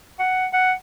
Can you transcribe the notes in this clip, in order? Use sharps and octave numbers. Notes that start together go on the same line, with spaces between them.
F#5
F#5